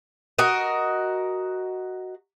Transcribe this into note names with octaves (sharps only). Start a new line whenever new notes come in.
F#4 A#4 D#5